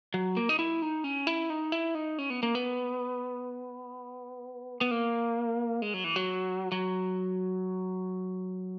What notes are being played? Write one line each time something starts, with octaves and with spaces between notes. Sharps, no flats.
F#3
A#3
D#4
E4
D#4
C#4
E4
D#4
E4
D#4
C#4
B3
A#3
B3
B3
A#3
G#3
F#3
E3
F#3
F#3